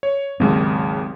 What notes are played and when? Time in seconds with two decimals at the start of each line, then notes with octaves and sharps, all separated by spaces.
0.03 C#5
0.40 G#1 D#2 C#3 F#3 G#3 C4